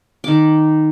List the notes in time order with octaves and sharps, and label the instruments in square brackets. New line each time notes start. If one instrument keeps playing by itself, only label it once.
[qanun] D#3 D6